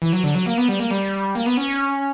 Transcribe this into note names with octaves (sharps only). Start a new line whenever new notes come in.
E3
F#3
D3
F#3
A#3
B3
G3
A#3
G3
A#3
B3
C#4